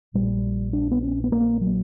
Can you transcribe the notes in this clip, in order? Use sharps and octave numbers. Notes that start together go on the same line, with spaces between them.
A#1 A#2 G3
D4
B3
C#4
B3
A#3
F#3